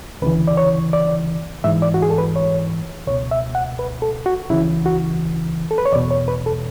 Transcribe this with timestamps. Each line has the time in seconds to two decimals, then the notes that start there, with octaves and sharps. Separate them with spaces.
0.22 D2 C#3 E3 B4
0.47 D5
0.57 C#5
0.93 D5
1.64 G#2 E3 E5
1.82 D5
1.94 F#4
2.02 G#4
2.10 A4
2.18 B4
2.36 C#5
3.07 C#2 C#5
3.10 B2
3.31 E5
3.55 F#5
3.79 B4
4.02 A4
4.26 F#4
4.50 C#2 C#3 E3 E4
4.86 F#4
5.71 A4
5.78 B4
5.85 C#5
5.92 E2 D5
5.96 B2
6.11 C#5
6.28 B4
6.46 A4